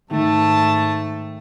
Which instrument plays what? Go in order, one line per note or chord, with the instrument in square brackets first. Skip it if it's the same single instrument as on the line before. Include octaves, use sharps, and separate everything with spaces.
[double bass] G#2 [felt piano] D#3 [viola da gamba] A3 [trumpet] A5